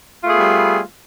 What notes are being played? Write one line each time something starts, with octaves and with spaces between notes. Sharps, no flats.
G3 A3 B3 F4 G#4